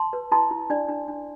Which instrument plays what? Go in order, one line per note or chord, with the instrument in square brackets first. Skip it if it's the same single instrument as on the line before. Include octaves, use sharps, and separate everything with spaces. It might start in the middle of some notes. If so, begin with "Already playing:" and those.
Already playing: [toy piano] A5 C6
B4
E4 A5 C6
E4
D4 D5
D4
D4